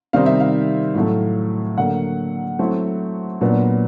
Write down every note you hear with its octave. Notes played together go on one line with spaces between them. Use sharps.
C3 D#3 G3 C4 D#4 F5
E5
F5
A2 F#3 A3
D3 F#3 A#3 F#5
F#3 A3 C4 E4
A#2 F#3 B3 D4